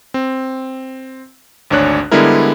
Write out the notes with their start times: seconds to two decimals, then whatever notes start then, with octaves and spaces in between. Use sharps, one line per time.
0.14 C4
1.70 G#1 D2 D4 C#5 F#6
2.11 D3 G3 G#3 B3 E4 A#4